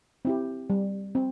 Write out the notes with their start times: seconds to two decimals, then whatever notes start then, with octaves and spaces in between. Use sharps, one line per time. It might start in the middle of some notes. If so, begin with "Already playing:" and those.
0.25 C4 E4 G4
0.70 G3
1.15 C4